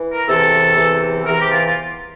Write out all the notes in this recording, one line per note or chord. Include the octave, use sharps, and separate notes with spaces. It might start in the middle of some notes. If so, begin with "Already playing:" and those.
Already playing: E3
A#4
E2 C3 E3 A4
E2 C3 E3
E2 C3 E3 A#4
G4
F4
F4